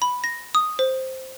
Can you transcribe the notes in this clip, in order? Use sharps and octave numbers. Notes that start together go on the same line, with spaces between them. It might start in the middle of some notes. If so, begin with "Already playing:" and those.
B5
A#6
D#6
C5